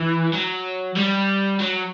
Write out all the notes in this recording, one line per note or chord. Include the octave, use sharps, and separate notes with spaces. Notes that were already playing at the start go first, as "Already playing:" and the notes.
Already playing: E3
F#3
G3
F#3